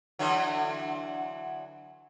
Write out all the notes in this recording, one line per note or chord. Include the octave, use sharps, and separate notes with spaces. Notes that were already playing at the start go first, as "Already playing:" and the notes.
D3 E3 F#3